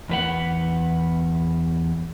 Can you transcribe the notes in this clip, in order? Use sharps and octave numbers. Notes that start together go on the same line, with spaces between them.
E2 B4 F#5